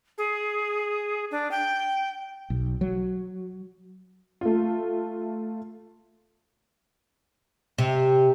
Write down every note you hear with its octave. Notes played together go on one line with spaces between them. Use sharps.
G#4
D4
G5
B1
F#3
A3 F4
C3